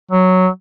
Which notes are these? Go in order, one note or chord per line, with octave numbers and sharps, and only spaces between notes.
F#3